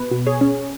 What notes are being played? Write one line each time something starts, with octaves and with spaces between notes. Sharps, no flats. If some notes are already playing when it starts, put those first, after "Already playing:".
Already playing: B2 B4
B2
G#4 C#5
C#4